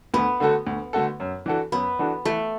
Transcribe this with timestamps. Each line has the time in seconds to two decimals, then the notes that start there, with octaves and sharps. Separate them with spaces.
0.14 D2 B3
0.40 D3 A3 F#4 A4
0.67 D2
0.93 D3 A3 F#4 A4
1.20 F#2
1.46 E3 D4 F#4 A4
1.72 F#2 B3
1.99 E3 D4 F#4 A4
2.25 E3 A3